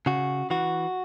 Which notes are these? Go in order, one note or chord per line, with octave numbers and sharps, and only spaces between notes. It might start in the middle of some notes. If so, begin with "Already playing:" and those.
C#3 F#4
E3 F#4